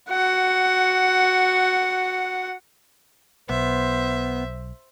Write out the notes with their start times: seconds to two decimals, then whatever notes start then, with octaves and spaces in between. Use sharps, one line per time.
0.10 F#4 F#5
3.49 B1 B3 C5 E5